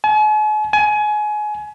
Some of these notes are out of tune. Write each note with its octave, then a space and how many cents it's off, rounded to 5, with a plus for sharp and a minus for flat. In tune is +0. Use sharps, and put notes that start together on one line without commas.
G#5 +45
G#5 +25